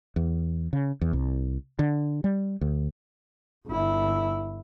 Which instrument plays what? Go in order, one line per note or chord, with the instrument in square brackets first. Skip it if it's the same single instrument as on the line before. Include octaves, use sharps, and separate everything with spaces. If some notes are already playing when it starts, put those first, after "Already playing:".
[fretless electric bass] E2
C#3
E2
C2
D3
G3
D2
[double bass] G1 E4